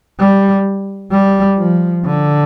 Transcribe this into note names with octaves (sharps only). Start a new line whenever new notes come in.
G3
G3
F3
D3